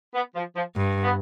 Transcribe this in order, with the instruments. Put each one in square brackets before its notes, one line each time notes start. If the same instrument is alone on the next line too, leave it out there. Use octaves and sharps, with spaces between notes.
[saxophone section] B3
F3
F3
[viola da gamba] G2
[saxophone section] B3